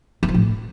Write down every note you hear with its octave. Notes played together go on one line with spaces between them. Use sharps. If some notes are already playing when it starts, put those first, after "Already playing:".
E3
F3
A2